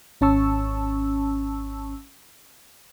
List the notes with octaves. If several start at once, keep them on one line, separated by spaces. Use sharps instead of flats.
G#1 C#4 A5 C#6 E6